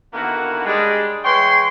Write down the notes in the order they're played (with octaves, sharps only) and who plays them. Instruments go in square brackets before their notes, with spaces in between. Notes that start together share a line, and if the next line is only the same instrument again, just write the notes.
[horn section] D3 D#3 A#3 B3 E4 F#4
G3 G#3 D4
E3 G#3 C#5 G5 C6